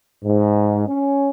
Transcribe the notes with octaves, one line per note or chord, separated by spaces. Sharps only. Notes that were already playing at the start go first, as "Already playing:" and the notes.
G#2
C#4